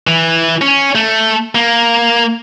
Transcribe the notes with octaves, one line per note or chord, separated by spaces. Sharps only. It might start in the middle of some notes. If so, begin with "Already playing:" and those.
E3
C#4
A3
A#3